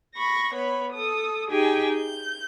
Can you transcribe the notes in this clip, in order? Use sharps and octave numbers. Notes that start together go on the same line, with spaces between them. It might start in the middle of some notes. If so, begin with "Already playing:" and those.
B5 C#6 A#6
B3 C#5 B5
A4 D#6
D#4 G4 G#4 G5 G#5
G6